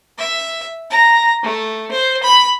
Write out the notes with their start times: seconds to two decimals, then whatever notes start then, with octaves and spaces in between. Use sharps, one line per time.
0.18 E5
0.90 A#5
1.43 A3
1.92 C5
2.23 B5